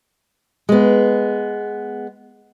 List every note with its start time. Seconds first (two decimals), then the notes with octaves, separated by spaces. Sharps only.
0.69 G#3 B3